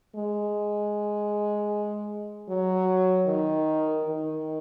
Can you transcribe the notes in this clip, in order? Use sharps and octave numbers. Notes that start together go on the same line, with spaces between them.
G#3
F#3
D#3
D#3